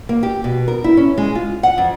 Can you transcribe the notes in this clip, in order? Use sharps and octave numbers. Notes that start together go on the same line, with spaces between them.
A#3
G4
B2
A#4
E4
C#4
G#3
F4
F#5
F2